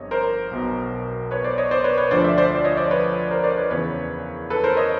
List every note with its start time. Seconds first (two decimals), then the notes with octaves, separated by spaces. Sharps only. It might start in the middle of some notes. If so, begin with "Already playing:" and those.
Already playing: G1 F2 C3 C#5 D#5
0.11 A#4 C5
0.51 B1 B2
1.31 B4 C#5
1.44 C5 D5
1.58 C#5 D#5
1.71 C5 D5
1.84 B4 C#5
1.97 B4 C#5
2.11 D2 D3 F3 C5 D5
2.24 D5 E5
2.38 C5 D5
2.51 C5 D5
2.64 C#5 D#5
2.77 C5 D5
2.91 B4 C#5
3.31 A#4 C5
3.44 C5 D5
3.57 B4 C#5
3.70 E2 C#3 E3 B4 C#5
4.50 A4 B4
4.64 A#4 C5
4.77 C#5 D#5